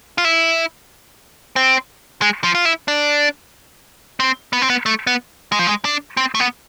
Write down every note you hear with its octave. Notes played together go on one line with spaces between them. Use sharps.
F4
E4
C4
G#3
F3
F4
E4
D4
C4
B3
C4
B3
A3
B3
G#3
F3
G#3
D4
C4
A3
B3